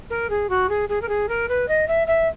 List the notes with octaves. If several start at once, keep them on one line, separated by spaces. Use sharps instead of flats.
A#4
G#4
F#4
G#4
G#4
A#4
G#4
A#4
B4
D#5
E5
E5